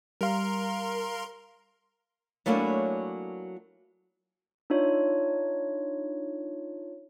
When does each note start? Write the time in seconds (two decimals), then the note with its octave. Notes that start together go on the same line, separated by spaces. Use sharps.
0.21 G3 A#4 F5 A#5 C6
2.46 F#3 A3 A#3 C#4 D4 E4
4.70 D4 D#4 F4 C#5